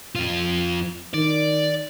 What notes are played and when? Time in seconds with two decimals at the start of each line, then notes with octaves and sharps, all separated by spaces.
0.15 F2 F4
1.14 D#3 D5